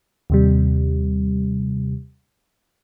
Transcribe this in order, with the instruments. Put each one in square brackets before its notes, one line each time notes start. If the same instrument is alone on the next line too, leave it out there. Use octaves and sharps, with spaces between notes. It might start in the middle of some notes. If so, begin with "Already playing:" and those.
[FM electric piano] D#2 C3 G3